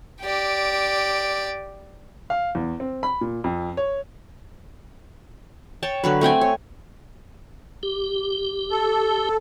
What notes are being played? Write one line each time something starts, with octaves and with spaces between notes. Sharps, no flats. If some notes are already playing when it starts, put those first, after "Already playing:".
G4 D5
F5
E2
C4
B5
A#2
F2
C#5
C#5 G5 A5
D3 F#3 B4
A3 C4 G5 G#5
C#5
G4
A4